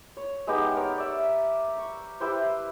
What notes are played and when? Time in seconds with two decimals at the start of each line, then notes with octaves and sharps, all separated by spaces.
0.17 C#5
0.47 G#3 B3 D#4 G4
0.76 A#4 C#5
0.98 D5 E5
1.78 C#6
2.20 E4 G4 B4 C5